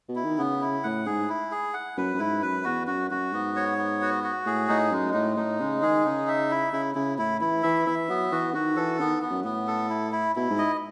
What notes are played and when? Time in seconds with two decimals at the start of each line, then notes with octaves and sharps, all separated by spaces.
0.09 B2
0.16 E4
0.24 D#3
0.38 C#3 B3
0.61 E4
0.83 A2 F#5
1.06 G#2 G#4
1.29 E4
1.51 G#4
1.74 F#5
1.97 F#2 B4
2.14 F#2
2.19 G#2 E4
2.42 F#2 B4
2.64 E2 F#4
2.87 F#2 F#4
3.11 F#2 F#4
3.32 G#2 B3
3.56 C#5
3.78 B3
4.01 F#4
4.24 F#4
4.46 A2 G#4
4.69 A2 D#4
4.91 F#2 G#3
5.14 A2 D#4
5.37 A2 D#4
5.60 C#3 G#3
5.82 D#3 G#4
6.05 C#3 D#4
6.28 E5
6.51 E4
6.72 C#3 E4
6.95 C#3 E4
7.18 A2 E4
7.41 E3 E4
7.63 E3 E5
7.86 E3 E5
8.09 F#3 B3
8.32 E3 F#4
8.54 D#3 F#4
8.76 E3 A4
8.99 D#3 B3
9.22 B3
9.30 F#2
9.44 A2 B3
9.67 A4
9.90 E4
10.12 E4
10.36 B2 E4
10.50 G#2
10.58 D#5